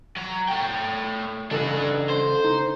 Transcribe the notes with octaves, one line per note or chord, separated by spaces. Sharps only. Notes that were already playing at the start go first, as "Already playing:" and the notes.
F#3 A#5
A3 G5
C#3 D4 A4 B4 D#5
C5
D#4